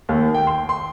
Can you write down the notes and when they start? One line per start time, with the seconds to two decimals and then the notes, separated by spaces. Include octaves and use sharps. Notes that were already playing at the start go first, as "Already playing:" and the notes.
0.09 D#2
0.34 G5
0.47 C6
0.69 C6